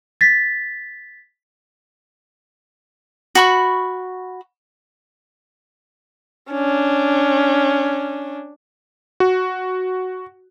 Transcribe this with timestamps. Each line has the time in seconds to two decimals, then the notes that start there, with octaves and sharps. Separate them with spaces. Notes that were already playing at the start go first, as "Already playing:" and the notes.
0.21 A6 B6
3.35 F#4 B5 C#6
6.51 C#4 D4
9.20 F#4